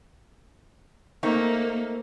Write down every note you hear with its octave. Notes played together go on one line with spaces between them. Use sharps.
A3 A#3 C4 D#4